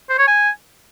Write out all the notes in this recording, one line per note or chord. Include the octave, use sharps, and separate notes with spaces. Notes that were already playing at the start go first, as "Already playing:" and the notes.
C5
C#5
G#5